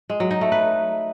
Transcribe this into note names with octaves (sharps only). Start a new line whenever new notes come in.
G#3
F#3
D#4
A3
B4